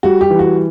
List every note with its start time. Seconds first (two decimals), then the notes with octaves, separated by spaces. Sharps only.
0.03 G3 F#4
0.21 G4
0.30 E3
0.39 F#4